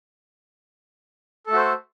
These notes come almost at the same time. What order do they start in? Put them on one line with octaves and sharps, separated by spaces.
A4 A3 F#4 C5